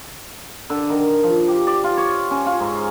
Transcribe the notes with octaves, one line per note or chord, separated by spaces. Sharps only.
D3
D#3
F3
G4
D5
F4
C#5
C#4
F4
G#2